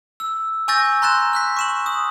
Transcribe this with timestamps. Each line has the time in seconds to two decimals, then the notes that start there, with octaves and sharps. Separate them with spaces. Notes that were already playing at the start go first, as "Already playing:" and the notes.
0.20 E6
0.68 G#5 C#6 E6 G6 A6 A#6
1.02 A#5 C6 F#6 A6 E7
1.33 F6 F#6 B6
1.57 C#6 E7 F#7
1.86 D#6